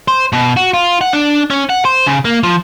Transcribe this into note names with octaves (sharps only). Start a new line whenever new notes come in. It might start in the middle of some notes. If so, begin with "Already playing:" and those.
C5
B2
F#4
F4
F#5
D4
C#4
F#5
C5
C#3
A#3
F3